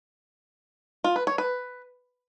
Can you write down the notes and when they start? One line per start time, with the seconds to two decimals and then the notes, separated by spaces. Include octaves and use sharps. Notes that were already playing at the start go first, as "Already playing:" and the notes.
1.04 F4
1.16 B4
1.27 C#5
1.38 B4